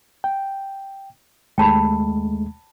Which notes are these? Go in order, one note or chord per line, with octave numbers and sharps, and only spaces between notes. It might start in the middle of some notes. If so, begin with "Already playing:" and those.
G5
D#2 G#3 A3 G5 A5 B5